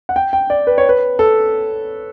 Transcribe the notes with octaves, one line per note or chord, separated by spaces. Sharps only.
F#5
G5
G5
D5
B4
C#5
B4
A4